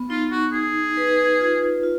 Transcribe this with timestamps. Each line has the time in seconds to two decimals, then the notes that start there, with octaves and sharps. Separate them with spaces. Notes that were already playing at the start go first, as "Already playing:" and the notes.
Already playing: B3
0.10 D#4 F4
0.31 F#4
0.53 D#4 G#4
0.97 B4
1.40 F4
1.83 F4